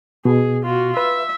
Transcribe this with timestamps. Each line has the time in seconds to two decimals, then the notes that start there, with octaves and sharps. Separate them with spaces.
0.25 B2 G#4
0.64 F4 F#4
0.97 B4 E5